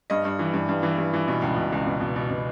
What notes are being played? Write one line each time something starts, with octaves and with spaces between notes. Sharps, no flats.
G2 D#5
G2
E3
G2
G2
E3
G2
E3
B2
C#2
B2
C#2
B2
B2
B2
B2